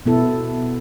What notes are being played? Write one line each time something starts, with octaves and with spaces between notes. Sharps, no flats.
B2 B3 E4 A4